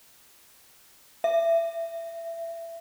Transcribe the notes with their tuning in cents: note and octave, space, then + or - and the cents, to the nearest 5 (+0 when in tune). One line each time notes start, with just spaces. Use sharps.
E5 +20